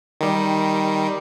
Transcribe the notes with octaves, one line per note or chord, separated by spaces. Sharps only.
D#3 G3